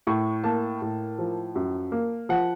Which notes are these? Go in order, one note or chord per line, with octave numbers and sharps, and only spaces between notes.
A2 C#6
A#3 A5
A2
F3
F#2
A#3
F3 F#5